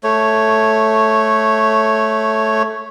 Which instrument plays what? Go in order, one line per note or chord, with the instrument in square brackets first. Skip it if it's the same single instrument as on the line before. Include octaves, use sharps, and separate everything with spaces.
[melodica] A3 C#5